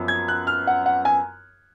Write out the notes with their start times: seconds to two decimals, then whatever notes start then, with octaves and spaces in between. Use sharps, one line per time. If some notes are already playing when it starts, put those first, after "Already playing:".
Already playing: F#2 F3 B3
0.08 G#6
0.28 F#6
0.47 F6
0.67 F#5
0.86 F#5
1.05 G#5